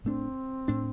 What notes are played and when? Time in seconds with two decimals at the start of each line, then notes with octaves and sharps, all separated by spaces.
0.05 A2 A3 C4 D4
0.68 A2 A3 D4